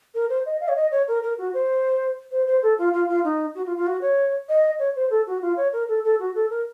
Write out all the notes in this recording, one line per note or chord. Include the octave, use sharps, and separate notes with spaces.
A#4
C5
D#5
F5
C#5
D#5
C#5
A#4
A#4
F#4
C5
C5
C5
A4
F4
F4
F4
D#4
F#4
F4
F4
F#4
C#5
D#5
C#5
C5
A4
F#4
F4
C#5
A#4
A4
A4
F#4
A4
A#4